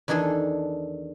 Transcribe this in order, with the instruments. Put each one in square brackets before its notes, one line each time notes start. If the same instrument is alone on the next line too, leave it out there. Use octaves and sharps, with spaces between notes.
[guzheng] E2 D#3 D4 G#4 A4